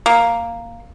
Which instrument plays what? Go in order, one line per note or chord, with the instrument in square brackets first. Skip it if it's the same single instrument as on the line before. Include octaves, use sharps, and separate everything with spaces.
[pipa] A#3